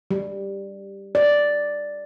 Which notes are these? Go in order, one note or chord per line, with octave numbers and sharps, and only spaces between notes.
G3
D5